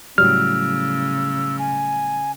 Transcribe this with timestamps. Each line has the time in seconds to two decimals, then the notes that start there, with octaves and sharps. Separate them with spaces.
0.18 A2 C#3 F#3 G3 E6 F6
1.59 G#5